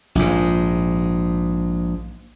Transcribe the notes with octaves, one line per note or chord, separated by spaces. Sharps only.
A#1 G#2